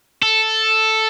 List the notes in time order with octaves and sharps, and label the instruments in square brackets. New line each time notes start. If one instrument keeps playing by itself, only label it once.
[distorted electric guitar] A4